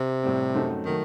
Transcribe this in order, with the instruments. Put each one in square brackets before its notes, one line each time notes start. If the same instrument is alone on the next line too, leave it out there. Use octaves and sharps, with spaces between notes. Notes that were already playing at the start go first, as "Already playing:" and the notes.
Already playing: [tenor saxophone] C3
[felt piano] A2 G3 C4
F#2 F#3 A3 C4 D#4
[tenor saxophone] D#3 [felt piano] F#3 A3